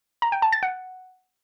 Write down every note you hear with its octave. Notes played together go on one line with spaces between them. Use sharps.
A#5
G5
A5
A6
F#5